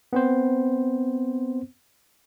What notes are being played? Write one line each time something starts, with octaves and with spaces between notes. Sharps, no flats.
B3 C4 C5